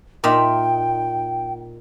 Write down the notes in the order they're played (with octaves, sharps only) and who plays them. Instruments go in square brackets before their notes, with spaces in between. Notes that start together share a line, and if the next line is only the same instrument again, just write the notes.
[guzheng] A#2 D#4 E5 [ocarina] G5